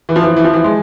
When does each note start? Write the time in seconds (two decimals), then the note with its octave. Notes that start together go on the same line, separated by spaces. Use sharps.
0.09 E3
0.16 F3
0.23 E3
0.36 E3
0.44 F3
0.53 E3
0.64 G#3